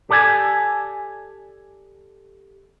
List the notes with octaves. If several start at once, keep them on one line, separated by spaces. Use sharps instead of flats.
G4 A4 D5 F#5 G#5 A5